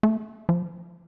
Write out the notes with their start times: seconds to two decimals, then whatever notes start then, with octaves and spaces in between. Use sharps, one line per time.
0.03 A3
0.49 F3